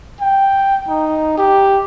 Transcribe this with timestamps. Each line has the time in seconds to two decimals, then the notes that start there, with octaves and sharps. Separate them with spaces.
0.21 G5
0.88 D#4
1.38 G4